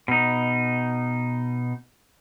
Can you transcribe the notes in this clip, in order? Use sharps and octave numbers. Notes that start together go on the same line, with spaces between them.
B2 D#4